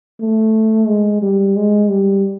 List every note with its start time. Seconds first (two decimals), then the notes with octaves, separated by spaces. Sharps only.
0.20 A3
0.88 G#3
1.22 G3
1.56 G#3
1.90 G3